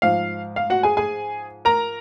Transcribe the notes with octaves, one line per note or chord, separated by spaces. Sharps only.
G#2 F3 F5
F5
F#4 F#5
G#4 G#5
G#4 G#5
A#4 A#5